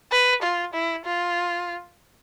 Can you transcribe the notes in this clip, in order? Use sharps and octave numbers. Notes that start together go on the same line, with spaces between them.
B4
F4
E4
F4